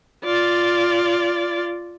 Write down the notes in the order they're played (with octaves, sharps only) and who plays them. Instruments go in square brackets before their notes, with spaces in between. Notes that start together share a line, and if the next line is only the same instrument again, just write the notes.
[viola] F4 D5